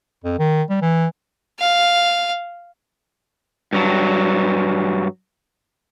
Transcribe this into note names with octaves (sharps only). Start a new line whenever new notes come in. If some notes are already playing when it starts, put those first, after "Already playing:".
F2
D#3
G3
E3
F5
G2 F#3